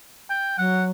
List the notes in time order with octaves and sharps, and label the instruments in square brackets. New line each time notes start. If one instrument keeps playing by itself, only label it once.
[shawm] G5
[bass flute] F#3 [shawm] F#5